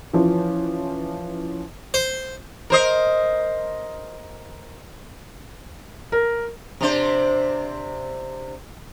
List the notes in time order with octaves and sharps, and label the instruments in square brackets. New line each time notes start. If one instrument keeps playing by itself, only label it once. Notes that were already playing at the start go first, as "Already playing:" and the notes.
[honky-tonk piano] E3 F3 C#4
[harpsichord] C5
[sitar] A#4 C5 D#5
[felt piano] A#4
[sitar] C3 D4 C5